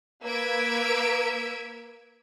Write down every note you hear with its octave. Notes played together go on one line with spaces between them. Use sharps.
A#3 B4 E6 G#6 B6 D7